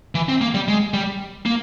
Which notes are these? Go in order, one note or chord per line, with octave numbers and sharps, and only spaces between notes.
E3
C4
A#3
G3
G#3
G3
A#3